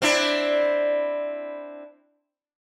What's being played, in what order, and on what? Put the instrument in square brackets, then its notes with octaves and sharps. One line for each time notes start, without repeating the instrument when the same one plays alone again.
[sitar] C4 D4 E4